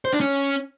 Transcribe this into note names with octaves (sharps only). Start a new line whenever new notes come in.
C5
D4
C#4